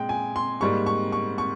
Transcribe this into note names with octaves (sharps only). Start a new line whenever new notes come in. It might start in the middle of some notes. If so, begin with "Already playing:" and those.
Already playing: A#2 G#3 G5
G#5
C6
G#2 G3 A#3 C#6
C#6
C#6
C#6